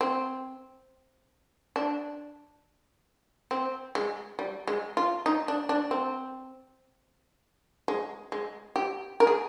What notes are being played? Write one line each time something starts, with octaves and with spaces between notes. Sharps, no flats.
C4
D4
C4
G#3
G3
G#3
F4
D#4
D4
D4
C4
G#3
G#3
G4
A#4
G#4